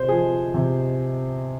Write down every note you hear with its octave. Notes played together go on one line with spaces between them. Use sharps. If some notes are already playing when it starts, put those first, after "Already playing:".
Already playing: C3 C5
F3 G#4
C3